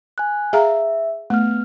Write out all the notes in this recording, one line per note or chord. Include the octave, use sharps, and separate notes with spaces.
G#5 F#6
G#4 E5 F5 A#5
A3 B3 F6